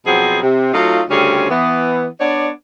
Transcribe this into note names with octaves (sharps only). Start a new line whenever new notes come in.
B2 F3 F#3 B3 C4 G#4
C3
F#3 A3 D#4 F4
D2 C#3 G3 C4 C#4 G#4
E3 B3
B3 D4 C#5 D5